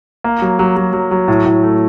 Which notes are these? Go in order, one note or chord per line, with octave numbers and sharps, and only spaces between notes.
A#3
F#3
F#3
F#3
F#3
F#3
A2
A2
A3